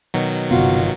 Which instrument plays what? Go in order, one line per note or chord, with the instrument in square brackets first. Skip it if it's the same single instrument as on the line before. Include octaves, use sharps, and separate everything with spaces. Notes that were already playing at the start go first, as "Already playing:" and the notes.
[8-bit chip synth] B2 D#3 F#3
[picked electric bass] G1 C3 B3 [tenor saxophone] F4 [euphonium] F#4